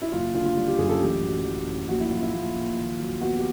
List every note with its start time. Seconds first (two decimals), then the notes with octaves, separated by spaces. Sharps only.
0.02 E4
0.12 F#1 F4
0.34 D3 F4
0.45 F4
0.57 G3
0.67 G4
0.78 F#2 G#4
0.89 A4
1.00 A1 G4
1.22 F#3
1.44 A1
1.67 A2
1.89 A#1 F#4
2.00 E4
2.11 F#3 F4
2.22 E4
2.33 A#1 F4
2.55 A#2
2.77 D#2
2.99 F#3
3.20 B3 F#4
3.36 G4